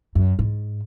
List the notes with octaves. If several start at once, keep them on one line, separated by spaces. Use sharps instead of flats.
F#2
G#2